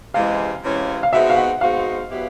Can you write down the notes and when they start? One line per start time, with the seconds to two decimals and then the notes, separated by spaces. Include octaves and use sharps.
0.14 C3 E3 G#3 C#4 F5
0.63 C3 E3 G#3 C#4
1.03 F5
1.13 B2 G#3 C4 D#4 F#4 E5
1.30 F5
1.36 F#5
1.61 B2 G#3 C4 D#4 F#4 F5
2.10 B2 F#3 B3 E4 G4